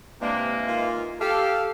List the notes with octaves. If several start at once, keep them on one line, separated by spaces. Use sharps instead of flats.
C3 E3 G#3 A#3 D4
A#2 D#4 F4
G4 A4 F5